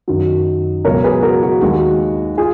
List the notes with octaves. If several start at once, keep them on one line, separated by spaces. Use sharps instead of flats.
F#2 D#3 F#3
C#2 B2 F#3 A#4 C#5
G#4 B4
F#4 A#4
F#4
D#2 D#3 G#3 F#4
F4 G#4